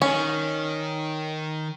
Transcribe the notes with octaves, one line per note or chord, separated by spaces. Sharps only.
D#3 C#4